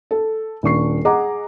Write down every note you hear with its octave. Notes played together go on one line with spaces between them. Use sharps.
A4
D#1 D4 C#6 C7
G#4 D#5 F#5 A#5 D6